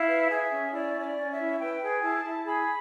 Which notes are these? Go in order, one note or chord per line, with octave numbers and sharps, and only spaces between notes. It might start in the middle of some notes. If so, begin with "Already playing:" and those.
Already playing: E4 F5
B4
G#4 E5
C#4
E4 D5
C#4
D5
C#4
E5
E4
B4 G5
G#4
E4 A5
E4
G#4 B5